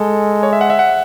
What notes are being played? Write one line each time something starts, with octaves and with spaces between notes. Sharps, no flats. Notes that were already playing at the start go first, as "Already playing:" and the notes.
Already playing: G#3 A4
C#5
E5
F#5
E5
F#5